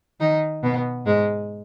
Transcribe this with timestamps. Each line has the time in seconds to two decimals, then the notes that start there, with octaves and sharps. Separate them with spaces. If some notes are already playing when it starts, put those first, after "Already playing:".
0.20 D#3 D#4
0.63 B2 B3
1.06 G#2 G#3